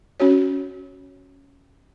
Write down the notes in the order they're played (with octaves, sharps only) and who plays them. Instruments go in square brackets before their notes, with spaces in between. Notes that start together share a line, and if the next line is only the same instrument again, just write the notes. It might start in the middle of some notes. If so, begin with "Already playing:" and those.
[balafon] C#4 F#4 C#5